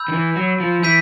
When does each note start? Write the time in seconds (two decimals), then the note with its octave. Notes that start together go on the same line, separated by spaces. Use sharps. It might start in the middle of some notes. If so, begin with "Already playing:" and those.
Already playing: B5 E6 G6
0.08 D#3
0.13 E3
0.36 F#3
0.60 F3
0.83 E3 E6 G6 B6 D#7